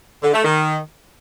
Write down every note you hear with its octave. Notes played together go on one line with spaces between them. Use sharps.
D3
A3
D#3